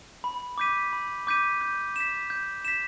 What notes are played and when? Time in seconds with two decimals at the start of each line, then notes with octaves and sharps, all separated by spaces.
0.24 B5
0.58 D6 G6 B6 D#7
0.93 B5
1.27 D6 G6 B6 D#7
1.61 G6
1.96 B6 E7
2.30 G6
2.65 B6 E7